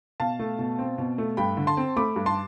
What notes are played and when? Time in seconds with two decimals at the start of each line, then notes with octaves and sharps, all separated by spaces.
0.20 B2 F5 A5
0.39 A3
0.59 B2
0.79 C4
0.98 B2
1.18 A3
1.37 G2 G5 B5
1.57 D3
1.67 A5 C6
1.77 C4
1.96 A3 B5 D6
2.16 G2
2.26 A5 C6